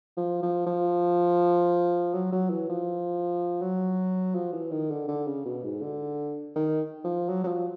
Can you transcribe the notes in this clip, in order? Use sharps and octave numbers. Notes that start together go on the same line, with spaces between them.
F3
F3
F3
F#3
F#3
E3
F3
F#3
F3
E3
D#3
D3
D3
C#3
B2
G#2
D3
D#3
F3
F#3
F#3
F3